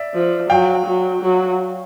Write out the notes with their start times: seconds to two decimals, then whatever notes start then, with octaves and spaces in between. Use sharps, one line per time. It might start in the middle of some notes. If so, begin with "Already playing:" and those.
Already playing: D5 E5
0.14 F3
0.49 F#3 F5 G5
0.86 F#3
1.22 F#3